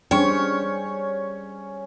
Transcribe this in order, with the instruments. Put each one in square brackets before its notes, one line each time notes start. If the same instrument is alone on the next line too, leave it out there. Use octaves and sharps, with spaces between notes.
[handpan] G3 G#4 C5 [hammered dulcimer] C#4 [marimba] D4 G5 [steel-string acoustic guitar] C#5